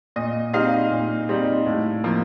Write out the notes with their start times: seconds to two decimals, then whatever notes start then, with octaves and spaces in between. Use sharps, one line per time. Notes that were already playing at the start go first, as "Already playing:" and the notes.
0.16 A#2 D#5
0.53 G3 C4 D#4 D#5 F5
0.91 A#2
1.29 G3 C4 D#4
1.66 A2
2.04 F3 A#3